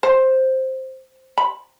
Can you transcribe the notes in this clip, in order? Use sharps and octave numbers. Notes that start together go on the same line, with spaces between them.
C5
B5